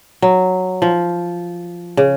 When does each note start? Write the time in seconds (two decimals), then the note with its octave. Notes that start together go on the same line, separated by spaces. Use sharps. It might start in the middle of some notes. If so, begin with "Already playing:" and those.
0.22 F#3
0.82 F3
1.97 C#3